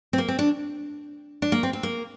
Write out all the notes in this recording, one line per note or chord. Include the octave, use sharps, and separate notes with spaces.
C4
A#3
C4
D4
D4
A#3
C4
C4
A#3